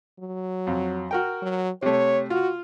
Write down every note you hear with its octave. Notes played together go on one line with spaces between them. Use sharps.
F#3
F2
F#4 A#4 G5
F#3
C3 A3 C#5
F4 F#4